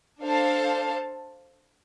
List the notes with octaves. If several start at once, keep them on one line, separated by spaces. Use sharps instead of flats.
D4 A4 C5 F5 A5